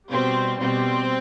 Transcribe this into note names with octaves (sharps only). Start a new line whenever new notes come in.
B2 G3 C4
B2 G3 C4